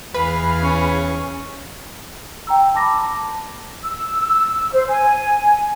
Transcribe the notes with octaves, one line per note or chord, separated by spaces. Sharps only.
E2 G#4 B4 F5
C#4
G5 A#5 E6
A5 B5 D6 A#6
E6
C5
G#5